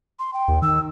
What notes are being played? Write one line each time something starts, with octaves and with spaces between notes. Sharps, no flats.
C6
G5
D#2
D#3 E6